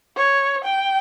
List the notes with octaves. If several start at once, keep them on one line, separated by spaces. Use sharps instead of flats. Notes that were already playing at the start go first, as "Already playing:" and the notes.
C#5
G5